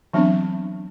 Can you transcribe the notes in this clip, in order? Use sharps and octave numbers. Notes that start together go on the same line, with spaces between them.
E3 F#3 B3 C4 D4